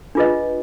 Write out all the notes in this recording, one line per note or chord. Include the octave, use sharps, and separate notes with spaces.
D4 F4 G#4 B4 D#5